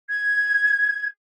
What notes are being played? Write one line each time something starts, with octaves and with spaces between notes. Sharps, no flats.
G#6